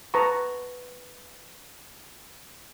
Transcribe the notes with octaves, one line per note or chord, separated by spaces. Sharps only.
B4 A5 A#5 C#6